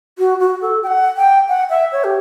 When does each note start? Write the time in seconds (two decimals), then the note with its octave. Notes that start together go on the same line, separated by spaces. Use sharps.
0.19 F#4
0.40 F#4
0.61 A4
0.83 G5
0.87 F#5
1.16 G5
1.48 F#5
1.70 E5
1.92 C#5
2.04 G4